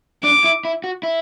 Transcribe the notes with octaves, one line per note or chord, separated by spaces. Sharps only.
D4 D6
E4
E4
F#4
E4